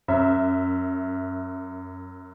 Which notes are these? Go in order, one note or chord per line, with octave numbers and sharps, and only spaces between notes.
F#2 E5